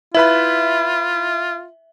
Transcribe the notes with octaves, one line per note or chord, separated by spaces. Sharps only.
E4 F4 B4 E5 B5